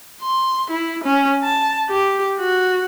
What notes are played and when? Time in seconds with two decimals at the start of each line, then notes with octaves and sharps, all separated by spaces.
0.21 C6
0.71 E4
1.04 C#4
1.43 A5
1.90 G4
2.39 F#4